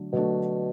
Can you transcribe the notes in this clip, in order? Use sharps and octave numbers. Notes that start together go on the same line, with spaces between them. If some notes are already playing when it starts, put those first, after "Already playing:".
Already playing: D3 F#3 A3 D4
B2 D3 F#3 A3 D4